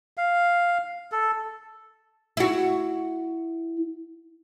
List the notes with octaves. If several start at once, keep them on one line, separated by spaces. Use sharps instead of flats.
F5
A4
E4 F#4